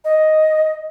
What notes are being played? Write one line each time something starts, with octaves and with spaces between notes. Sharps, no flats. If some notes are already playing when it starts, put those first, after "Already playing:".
D#5